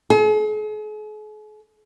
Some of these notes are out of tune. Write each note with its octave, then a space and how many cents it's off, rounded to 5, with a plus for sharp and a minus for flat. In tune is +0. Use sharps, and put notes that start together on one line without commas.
G#4 +45